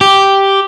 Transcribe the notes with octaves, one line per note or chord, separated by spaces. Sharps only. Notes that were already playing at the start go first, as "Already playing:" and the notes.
G4